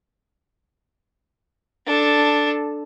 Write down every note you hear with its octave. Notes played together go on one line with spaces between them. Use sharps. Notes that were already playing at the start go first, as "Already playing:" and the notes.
D4 A4